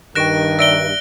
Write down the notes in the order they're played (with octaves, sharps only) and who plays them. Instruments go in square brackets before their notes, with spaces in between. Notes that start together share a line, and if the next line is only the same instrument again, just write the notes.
[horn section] G2 D#3 [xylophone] G5 C#6 E7 [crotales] F#6 A#6 D7
[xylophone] D5 E5 E6 [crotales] A#6 D7 G7